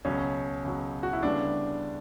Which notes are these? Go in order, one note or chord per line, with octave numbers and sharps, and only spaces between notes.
C#2 B2 F#3 C#4
C#2 B2 F#3
F#4
E4
D2 C#3 G3 B3 D4